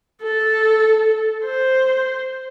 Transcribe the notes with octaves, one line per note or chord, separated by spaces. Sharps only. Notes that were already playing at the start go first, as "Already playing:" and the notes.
A4
C5